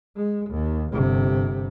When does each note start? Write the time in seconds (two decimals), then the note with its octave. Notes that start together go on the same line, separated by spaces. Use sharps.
0.16 G#3
0.51 D#2
0.92 G1 C3